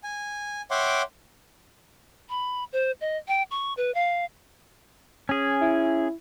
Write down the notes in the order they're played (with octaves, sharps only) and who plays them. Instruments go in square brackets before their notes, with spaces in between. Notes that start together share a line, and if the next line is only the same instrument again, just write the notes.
[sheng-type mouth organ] G#5
C#5 E5 F#5 G5 C6 D6
[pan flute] B5
C5
D#5
G5
C#6
B4
F5
[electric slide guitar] C#4 G#4
[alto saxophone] E4